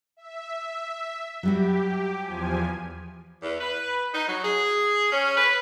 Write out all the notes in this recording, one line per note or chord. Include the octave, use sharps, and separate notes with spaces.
E5
F#3 G3 F#4 G4
E2 F3 G#5
E2
B4
D#4
F#3
G#4
C#4
B4